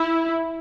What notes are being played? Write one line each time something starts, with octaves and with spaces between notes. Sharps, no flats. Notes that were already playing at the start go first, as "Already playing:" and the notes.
Already playing: E4